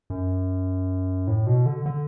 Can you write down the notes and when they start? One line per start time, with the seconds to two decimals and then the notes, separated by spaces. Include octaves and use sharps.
0.10 F#2
1.27 A2
1.47 B2
1.66 D3
1.86 D3